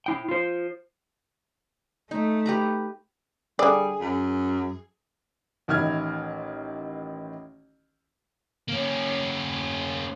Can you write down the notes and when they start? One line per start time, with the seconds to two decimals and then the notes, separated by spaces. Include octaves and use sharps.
0.06 E4 G5
0.29 F4 C5
2.11 A3 D#4
2.46 G4 B4 A#5
3.59 D3 G3 G#4 D5
4.01 F#2
5.68 A1 D#3 E4 F6 G#6
8.68 A#3 C#4